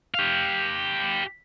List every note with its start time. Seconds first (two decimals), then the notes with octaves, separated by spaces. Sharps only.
0.14 G4 F5